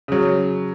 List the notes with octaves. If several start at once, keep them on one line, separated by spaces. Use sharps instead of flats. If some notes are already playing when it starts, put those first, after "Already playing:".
C#3 F#3